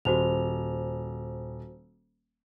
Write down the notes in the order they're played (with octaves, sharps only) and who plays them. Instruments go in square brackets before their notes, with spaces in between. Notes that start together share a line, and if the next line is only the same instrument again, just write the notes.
[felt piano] D#1 [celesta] F#4 C5 F7